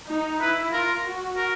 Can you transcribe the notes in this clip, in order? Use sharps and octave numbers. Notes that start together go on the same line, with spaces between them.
D#4
E4 B4
F4 A#4
F#4
A#4